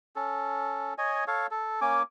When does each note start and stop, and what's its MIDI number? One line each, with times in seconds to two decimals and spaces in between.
0.16 0.94 61
0.16 0.94 69
0.98 1.24 73
0.98 1.24 75
0.98 1.24 80
1.27 1.47 69
1.27 1.47 73
1.27 1.47 77
1.51 1.80 69
1.81 2.03 58
1.81 2.03 61
1.81 2.03 80
1.81 2.03 86